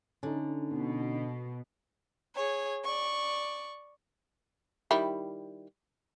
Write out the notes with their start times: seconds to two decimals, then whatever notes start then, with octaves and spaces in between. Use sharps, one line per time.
0.23 D3 C#4 D#4
0.72 B2
2.36 G#4 C#5
2.84 D5 C#6
4.91 D#3 G3 E4